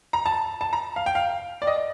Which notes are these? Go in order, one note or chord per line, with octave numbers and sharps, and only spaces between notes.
A#5
A5
A5
A#5
F5
G5
F5
D5
D#5